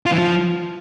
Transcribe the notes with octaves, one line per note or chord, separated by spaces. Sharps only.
F4
E3
F3